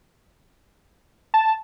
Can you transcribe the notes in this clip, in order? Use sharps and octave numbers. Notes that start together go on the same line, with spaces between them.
A5